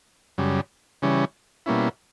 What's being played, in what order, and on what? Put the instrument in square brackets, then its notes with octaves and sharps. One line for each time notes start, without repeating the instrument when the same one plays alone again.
[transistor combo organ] F#2 C#3 G3
C#3 E3 G3 C#4
B2 G3 A#3 C#4 E4